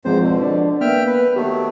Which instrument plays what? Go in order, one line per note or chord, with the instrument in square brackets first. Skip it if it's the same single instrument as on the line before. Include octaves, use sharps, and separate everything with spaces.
[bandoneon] E2 G#2 C5 [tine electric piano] F3 G#3 C4
[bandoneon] B2 D3
[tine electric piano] D4 D5
[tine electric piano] A#3 B3 [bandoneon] E5 G5 F6
[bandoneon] B4
[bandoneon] D#3 F#3 A3 [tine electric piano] G4